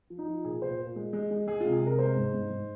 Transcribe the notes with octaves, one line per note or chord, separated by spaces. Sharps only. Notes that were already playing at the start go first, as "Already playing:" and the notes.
F3
D#4
F3
A#2 G#4
A#2 C5
A#2
G#3
G#3
G#3
G#3 G#4
C3 F4
G#4
C3 A#4
G#3 C5
G#2
G#2
G#2